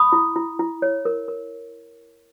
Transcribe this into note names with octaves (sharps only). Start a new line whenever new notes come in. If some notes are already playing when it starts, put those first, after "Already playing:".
Already playing: B5 D#6
E4
E4
E4
C#5
A#4
A#4